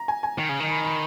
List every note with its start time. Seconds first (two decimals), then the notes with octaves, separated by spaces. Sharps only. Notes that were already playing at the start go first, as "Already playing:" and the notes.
Already playing: A#5
0.08 G#5
0.23 G#5
0.39 D#3
0.49 C#3
0.60 D#3
0.70 B5
0.84 B5